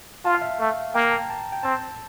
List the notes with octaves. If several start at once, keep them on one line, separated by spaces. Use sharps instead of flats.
F4 A5
F5
E5
A3
A#3 G5
A#5
A5
A5
G5
C4 A5